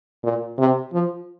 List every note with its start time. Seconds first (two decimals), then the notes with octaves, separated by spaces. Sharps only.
0.24 A#2
0.59 C3
0.93 F3